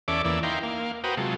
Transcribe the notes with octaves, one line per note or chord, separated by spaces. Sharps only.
E2 C#4 A4 D5 E5 D6
E2 E3 A#3 D5 E6
D#4 E4 F5 G5 A#5 C6
A#3 F5
F#4 B4 C5 G5 A#5 D#6
C3 F#3 G#3 F4 A4